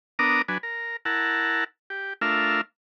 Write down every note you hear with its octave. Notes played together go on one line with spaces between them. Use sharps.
B3 D4 A#4 A#5 D6 D#6
F#3 D4 B4 G#5
A#4
E4 A#4 F#5 A5
G4
A3 D4 F4 A#4 E5 F5